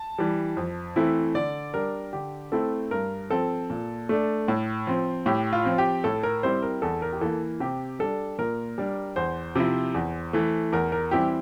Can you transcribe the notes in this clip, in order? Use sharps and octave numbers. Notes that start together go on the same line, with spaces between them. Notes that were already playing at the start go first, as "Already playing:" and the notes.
Already playing: A5
E3 G3
F2
E3 A3 C4 E4
D3 D5
G3 D4 A#4
D3 G4
A3 C4 E4 A4
G2 A#4
F3 C4 A4
A#2
A3 D4
A2
F3 C4
A2 G4
F4
F3 C4
G4
A2 A4
A#4
G3 C4 E4 C5
A#4
E2 A4
A#4
G4
E3 A#3 A4
C3 G4
G3 D4 A4
A#2 A#4
G3 D4
E2 C5
C3 F3 C4 E4
E2
E3 A3
E2 A#4
A#4
E3 G3 C4 E4 G4